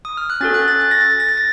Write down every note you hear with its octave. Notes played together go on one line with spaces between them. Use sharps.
D#6
F6
F#6
C#4 F#4 A4 A6
F#6
A6
A6
A#6
A6
A6
A#6
A6
A#6